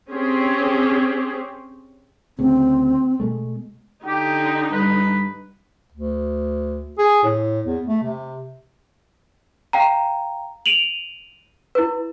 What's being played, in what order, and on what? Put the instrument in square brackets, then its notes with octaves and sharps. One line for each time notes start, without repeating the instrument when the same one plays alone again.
[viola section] C4 C#4 G4 G#4
[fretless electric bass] D2 C#3 [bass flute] C4
[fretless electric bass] B2 G#3 A3
[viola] D3 D#4 [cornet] G4
[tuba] G2 [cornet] B4
[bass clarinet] D2
G#4
A2
E2
A3
C3
[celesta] F5 G5 A#5
D7 D#7 F7 F#7
E4 B4